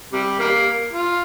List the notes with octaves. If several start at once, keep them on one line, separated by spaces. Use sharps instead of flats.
C3 G3
G3 A#3
F4